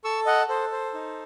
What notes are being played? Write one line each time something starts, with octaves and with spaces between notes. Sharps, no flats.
A4 C#6 E6
D#5 F#5
A4 C5
C5
D#4